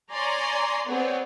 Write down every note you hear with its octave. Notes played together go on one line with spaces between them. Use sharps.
C#5 D5 G#5 A#5 C6
B3 C4 G#4 C#5 D5